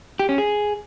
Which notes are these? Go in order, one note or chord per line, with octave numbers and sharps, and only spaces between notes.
G4
C#4
G#4